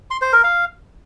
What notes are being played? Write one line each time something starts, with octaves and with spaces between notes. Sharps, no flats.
C6
C5
A#4
F5